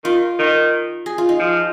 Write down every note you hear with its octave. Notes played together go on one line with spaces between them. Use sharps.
D#3 F4
D#3
G#4
F4
D#4
F3